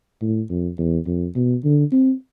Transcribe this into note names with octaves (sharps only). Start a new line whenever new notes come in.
A2
F2
E2
F2
B2
D3
C4